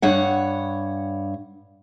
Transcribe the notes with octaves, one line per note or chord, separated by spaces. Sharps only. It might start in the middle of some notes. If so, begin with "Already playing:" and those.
G2 C#5 F#5